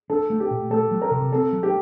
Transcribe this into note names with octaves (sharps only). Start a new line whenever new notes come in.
D4 A4
A3
G4
A#2
A3 A4
F#3
A#4
C3
C4 A4
F#3
G4